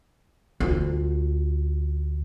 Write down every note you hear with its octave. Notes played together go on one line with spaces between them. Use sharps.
D2 F4